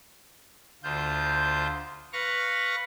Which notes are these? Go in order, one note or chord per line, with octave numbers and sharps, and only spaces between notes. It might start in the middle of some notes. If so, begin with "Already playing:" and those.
D2 F4 C5 G6
B4 F5 C#6 A#6